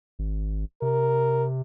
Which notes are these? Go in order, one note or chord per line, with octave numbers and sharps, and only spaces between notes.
G#1
C3 A#4